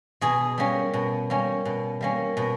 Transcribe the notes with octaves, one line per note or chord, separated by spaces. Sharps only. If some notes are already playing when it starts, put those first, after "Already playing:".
B2 G#4
G3 A#3 C#4
B2
G3 A#3 C#4
B2
G3 A#3 C#4
B2